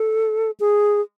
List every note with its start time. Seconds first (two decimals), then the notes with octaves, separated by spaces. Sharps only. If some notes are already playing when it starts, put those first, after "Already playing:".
Already playing: A4
0.60 G#4